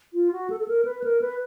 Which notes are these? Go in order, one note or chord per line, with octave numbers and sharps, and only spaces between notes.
F4
F#4
A4
A4
A#4
B4
A#4
B4